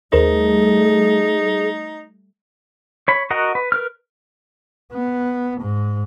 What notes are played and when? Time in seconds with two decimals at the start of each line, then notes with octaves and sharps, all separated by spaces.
0.13 D#2 G3 A3 D#4 G#4 A#4 C5
3.08 C#5 B5
3.30 F#4 A#4 D#5 F#5 A#5
3.55 B4
3.72 A#4 B4 F6
4.93 B3
5.61 G#2